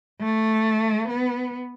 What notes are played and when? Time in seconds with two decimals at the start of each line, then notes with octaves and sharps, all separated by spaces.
0.21 A3
1.09 B3